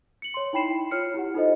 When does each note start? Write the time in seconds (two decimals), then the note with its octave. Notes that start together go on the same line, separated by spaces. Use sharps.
0.22 C#7 F#7
0.34 C#5 C6
0.53 D#4 E4 G5 B5 C7 E7
0.91 F4 C#5 F6 C#7
1.14 E4 G4 F#5
1.34 D#4 F4 A4 C5 D#5